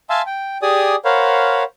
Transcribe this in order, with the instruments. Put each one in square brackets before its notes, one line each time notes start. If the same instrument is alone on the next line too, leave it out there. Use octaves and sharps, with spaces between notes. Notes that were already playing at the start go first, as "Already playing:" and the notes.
[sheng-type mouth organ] E5 F5 G#5 A5 C6 E6
G5
G4 G#4 D5 G#5 D#6
A#4 C5 C#5 F5 F#5 B5